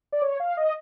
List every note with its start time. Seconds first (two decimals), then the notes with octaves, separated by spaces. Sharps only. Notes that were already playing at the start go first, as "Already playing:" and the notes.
0.12 D5
0.22 C#5
0.40 F5
0.57 D#5